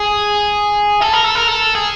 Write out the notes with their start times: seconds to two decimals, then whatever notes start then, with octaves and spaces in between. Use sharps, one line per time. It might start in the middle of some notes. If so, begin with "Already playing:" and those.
Already playing: G#4
1.01 A4
1.13 A#4
1.24 A4
1.35 A#4
1.48 A4
1.75 G#4